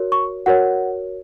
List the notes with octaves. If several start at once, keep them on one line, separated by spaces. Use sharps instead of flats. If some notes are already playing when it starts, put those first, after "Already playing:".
Already playing: F#4 A#4 C#5
C#6
F#4 A#4 C#5 F#5